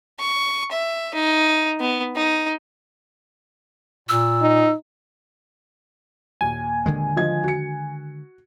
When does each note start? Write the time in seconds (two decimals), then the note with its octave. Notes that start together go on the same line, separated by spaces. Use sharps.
0.19 C#6
0.71 E5
1.14 D#4
1.80 B3
2.16 D#4
4.09 A#2 E6
4.42 D#4
6.41 D#2 A#2 G#5
6.86 D3 D#3 G#3
7.16 F3 D#5 G#6
7.44 F#4 C#7